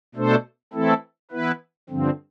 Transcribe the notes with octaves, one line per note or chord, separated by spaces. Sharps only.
B2 A3 D4 A4 C5
E3 A3 C4 E4 A4
E3 B3 E4 B4
G2 D3 F3 C4